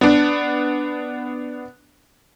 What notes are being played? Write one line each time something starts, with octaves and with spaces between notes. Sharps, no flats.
B3 D4